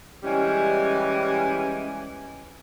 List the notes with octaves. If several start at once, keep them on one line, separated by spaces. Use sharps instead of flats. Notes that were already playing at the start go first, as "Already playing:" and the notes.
E3 G3 G#3 C#4